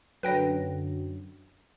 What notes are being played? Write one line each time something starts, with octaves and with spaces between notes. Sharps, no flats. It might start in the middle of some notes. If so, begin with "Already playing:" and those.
F#2 D3 F#3 B4 G5 A#6